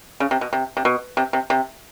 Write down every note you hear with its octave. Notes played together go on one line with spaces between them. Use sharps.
C#3
C3
B2
C3
C3
B2
C3
C3
C3